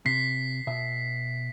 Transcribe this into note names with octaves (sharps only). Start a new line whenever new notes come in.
C3 B6 C7
B2 E5